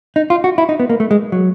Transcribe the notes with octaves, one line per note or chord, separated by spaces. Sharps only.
D#4
F4
F#4
E4
D#4
B3
A#3
A3
G#3
F#3